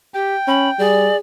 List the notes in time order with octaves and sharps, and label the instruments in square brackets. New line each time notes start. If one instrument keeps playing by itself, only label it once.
[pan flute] G4 [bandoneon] G5
[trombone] C#4 [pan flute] B5
[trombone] G3 [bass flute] G#4 [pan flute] D5